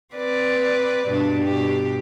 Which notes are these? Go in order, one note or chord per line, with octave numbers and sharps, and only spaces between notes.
C4 B4 D5
G2 B2 D4
B2 G4